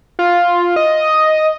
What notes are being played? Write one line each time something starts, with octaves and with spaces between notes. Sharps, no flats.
F4
D#5